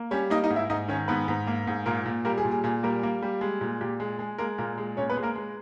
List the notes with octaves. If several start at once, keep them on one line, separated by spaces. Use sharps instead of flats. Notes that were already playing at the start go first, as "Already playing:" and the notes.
Already playing: A#3
G3 C#4 C#5
A#3 D#4 D#5
D#4 D#5
G#2
E4 E5
G#2 D#4 D#5
D#3 C#4 C#5
G#2 B3 B4
G#2
A#3
G#2
A#2 A#3 A#4
A#2
G3 A#3 A#4
G#4
A#2
G#4
A#2 G#4
G3 A#3 A#4
A#3
G3
G#3
A#2
A#2 G4
G#3
G#3 G#4
G#3 A#3 A#4
A#2 A#3 A#4
G#3
A#2 C#4 C#5
B3 B4
G#3
A#3 A#4
G#3